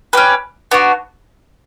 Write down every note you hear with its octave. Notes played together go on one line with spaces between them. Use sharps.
C#4 G4 B4
B3 D4 F#4